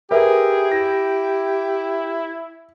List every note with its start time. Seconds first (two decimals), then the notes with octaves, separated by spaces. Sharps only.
0.11 G4 G#4 A#4 B4 E5
0.71 E4 A#6